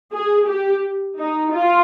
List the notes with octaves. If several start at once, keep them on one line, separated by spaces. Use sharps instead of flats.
G#4
G4
D#4
F4